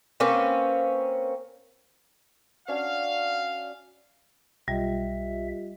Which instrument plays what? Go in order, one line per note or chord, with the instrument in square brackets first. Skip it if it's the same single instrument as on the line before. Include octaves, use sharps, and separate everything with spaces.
[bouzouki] A#3 C4 C#4 B4
[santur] C#4 D4 F#4 [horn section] F5
[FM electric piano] B1 [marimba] G3 [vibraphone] F4 G4 D#5 [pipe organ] E5